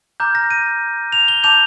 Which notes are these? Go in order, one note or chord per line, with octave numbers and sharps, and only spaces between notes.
A#5 D6 F6 G6
A#6
D#7
F7
G7
A5 D6 G6 F7